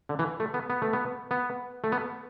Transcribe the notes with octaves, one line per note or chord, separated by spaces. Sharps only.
D3
E3
A3
B3
B3
A3
B3
B3
A3
B3